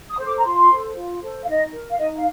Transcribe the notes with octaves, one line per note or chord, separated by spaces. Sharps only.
D#6
A4 C5
D6
A#5
F4 C6
A4 C5
F4
A4 C5
F5
D#4 D#5
A#4
F5
D#4 D#5
F5